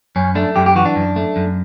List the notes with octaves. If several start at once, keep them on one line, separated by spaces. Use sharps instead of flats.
F#2 C#4
A3 D4
F#2 G4
G4
E3 F#4
D4
F#2
A3
F#2